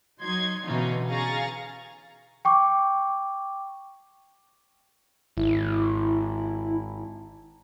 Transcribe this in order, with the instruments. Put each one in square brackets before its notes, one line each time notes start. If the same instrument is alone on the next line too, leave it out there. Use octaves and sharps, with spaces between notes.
[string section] F#3 D#4 C6 G#6
B2 D3 E3 C#4 D#4 F4
C#4 G#4 F5 A#5 C#6 A6
[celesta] G5 C#6 D6
[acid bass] G#1 [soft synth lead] E4